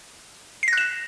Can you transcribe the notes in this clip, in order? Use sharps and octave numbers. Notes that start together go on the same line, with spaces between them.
F#6 A#6 C7 E7